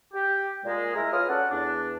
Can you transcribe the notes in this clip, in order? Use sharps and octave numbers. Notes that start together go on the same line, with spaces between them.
G4
A#2 G#3
G#3 E4 A#4
F4 B4 C#5 D#6 F6
C#4 F#4 A4 D5 F#5
E2 D4